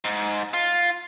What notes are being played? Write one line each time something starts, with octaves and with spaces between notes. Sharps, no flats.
G#2
F4